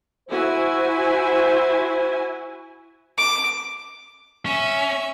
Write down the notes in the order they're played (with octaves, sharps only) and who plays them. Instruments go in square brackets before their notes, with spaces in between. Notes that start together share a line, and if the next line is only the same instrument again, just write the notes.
[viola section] E4 F#4 G#5 [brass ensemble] C5
[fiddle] D6
[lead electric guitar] C#4 [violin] E5